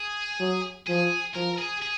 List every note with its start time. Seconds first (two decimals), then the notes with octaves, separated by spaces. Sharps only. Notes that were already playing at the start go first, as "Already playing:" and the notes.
Already playing: G#4
0.40 F#3
0.87 F3 G#4
1.35 F3 A#4
1.59 G#4
1.82 G#4